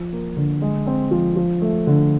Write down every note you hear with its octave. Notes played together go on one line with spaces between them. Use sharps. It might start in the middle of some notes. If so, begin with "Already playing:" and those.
Already playing: F3
A#3
D3
G#3
C4
F3
F3
A3
D3